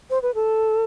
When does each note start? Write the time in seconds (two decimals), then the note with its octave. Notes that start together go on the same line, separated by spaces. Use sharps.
0.10 C5
0.22 B4
0.35 A4